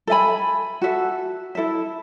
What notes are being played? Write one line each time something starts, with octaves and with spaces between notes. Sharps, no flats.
A4 E5 G#5 B5
F#4 A4 E5
E4 A4 E5